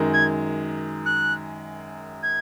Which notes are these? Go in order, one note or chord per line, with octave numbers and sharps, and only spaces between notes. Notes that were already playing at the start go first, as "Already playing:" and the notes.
Already playing: F#2 D#3 G#3
G#6
F#6
G#6